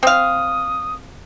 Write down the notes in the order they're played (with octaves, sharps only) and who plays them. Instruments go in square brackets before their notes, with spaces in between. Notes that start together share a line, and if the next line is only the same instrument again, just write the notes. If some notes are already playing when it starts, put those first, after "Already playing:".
[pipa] C4 F5 [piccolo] D#6